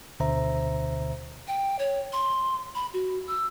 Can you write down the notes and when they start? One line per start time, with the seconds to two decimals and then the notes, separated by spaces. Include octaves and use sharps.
0.20 D2 B2 D3 C5 E5 A#5
1.48 G5
1.79 C#5
2.13 C6
2.75 B5
2.94 F#4
3.27 E6